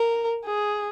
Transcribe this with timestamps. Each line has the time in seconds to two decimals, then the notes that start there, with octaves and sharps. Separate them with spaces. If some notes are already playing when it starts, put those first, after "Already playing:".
Already playing: A#4
0.45 G#4